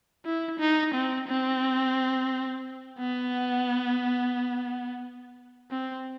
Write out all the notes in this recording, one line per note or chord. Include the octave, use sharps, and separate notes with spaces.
E4
D#4
C4
C4
B3
C4